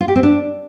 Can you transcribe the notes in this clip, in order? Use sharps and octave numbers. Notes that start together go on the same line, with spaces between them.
F4
G4
C4
D4